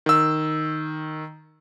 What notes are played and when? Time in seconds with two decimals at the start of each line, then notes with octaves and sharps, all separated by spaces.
0.06 D#3 E6